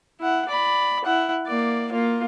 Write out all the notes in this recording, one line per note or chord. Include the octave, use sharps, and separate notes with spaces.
E4 F#5
D5 B5
E4 F#5
A#3 D5
A#3 F4